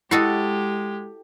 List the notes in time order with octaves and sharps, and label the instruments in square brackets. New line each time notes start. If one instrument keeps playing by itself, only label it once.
[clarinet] G#3 [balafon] E4 [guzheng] F#4 A4 D#5 [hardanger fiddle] G4